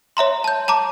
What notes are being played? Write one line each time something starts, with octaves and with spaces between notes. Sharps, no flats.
C#5 E5 A#5 C6
A5 G6
A5 A#5 D6